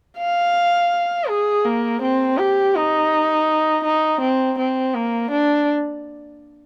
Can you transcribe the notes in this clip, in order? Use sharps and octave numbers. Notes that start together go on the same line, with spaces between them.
F5
G#4
A#3
C4
G4
D#4
D#4
C4
C4
A#3
D4